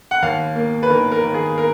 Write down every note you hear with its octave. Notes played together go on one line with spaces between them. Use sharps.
F#5
D#2 F5
A#3
B4
D#3 A#4
A#4
D#2
G#4
A#4